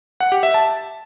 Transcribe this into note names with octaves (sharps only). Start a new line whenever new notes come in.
F#5
G4
E5
A5